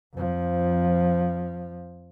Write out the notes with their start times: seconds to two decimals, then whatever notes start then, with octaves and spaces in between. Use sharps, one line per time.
0.14 F2 F3